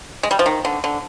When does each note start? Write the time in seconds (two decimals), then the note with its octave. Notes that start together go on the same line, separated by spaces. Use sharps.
0.23 G#3
0.31 G3
0.39 F3
0.46 D#3
0.65 D3
0.84 D3